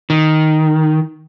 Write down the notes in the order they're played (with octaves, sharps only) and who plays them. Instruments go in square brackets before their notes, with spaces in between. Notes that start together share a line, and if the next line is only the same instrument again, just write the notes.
[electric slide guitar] D#3